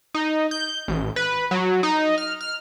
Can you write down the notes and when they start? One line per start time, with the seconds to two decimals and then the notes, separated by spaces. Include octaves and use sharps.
0.14 D#4
0.51 G6
0.88 A1
1.16 B4
1.51 F#3
1.83 D#4
2.18 F6
2.41 F6